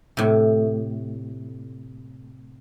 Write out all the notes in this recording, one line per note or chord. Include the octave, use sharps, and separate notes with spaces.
A2 C3